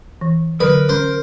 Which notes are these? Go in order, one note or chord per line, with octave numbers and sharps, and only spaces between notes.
E3
D3 F#3 A#4 B4
C#4 C5